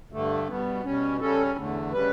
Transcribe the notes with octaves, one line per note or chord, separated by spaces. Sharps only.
G2 D3 A3
B2 G3 B3
B2 G3 C#4
C#3 G3 C#4 A4
E2 D3 A3
C#3 G3 B4